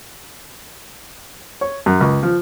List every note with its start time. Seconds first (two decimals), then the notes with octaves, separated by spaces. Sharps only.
1.61 C#5
1.86 F#2
2.01 C#2
2.23 F3